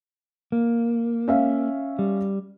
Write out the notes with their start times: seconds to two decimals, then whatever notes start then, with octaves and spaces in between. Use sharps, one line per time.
0.52 A#3
1.28 C#4 E5 F5
1.99 G3